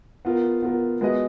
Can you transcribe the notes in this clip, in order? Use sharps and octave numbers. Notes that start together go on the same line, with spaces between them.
B3 F4 A#4
B3 F4 A#4
G#3 B3 F#4 B4 D#5